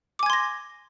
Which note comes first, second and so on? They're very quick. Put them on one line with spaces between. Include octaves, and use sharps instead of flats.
D6 G#5 G#6 C6 A#6